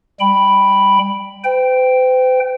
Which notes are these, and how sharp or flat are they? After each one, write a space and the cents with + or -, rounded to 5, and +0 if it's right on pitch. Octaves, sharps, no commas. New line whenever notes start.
G3 +10 G5 +0 B5 +0
C5 -45 G5 +0